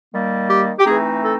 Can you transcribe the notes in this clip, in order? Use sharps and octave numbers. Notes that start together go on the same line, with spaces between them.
D#3 G3 A#3
G4
G4
E3 A3 C4 D#4 G#4
A4